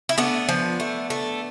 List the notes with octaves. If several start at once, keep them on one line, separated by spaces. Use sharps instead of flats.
E4
A3 B3 D4
F3
A3
A3